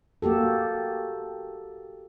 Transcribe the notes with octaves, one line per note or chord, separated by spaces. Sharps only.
A#3 F#4 G4 A4